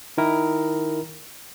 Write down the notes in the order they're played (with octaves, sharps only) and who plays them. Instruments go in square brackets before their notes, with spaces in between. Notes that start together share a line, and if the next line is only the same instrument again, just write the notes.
[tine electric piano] D#3 E4 A#4